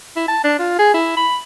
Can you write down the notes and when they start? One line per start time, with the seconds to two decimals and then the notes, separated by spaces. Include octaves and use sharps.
0.16 E4
0.28 A5
0.44 D4
0.59 F4
0.78 G#4
0.94 E4
1.17 B5